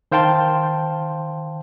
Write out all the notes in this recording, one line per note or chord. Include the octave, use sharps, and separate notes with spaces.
D#3 C5 F5 G5 A5 C6